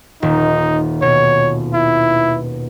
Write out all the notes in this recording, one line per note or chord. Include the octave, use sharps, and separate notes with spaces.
D#1 D#4
B2 C#5
E4